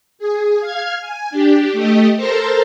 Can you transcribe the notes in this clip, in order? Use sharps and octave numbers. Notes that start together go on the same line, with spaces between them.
G#4
F5 F6 G#6
G#5
D4 G4
A3 G4 D#5
A4 A#4 C5 A5 A#5 C6